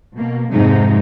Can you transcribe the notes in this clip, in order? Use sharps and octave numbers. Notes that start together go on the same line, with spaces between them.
B2 A#3
F2 G#2 C3 G#3 D#4